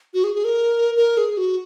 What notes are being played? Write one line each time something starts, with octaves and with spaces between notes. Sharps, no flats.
F#4
G#4
G#4
A#4
A#4
G#4
F#4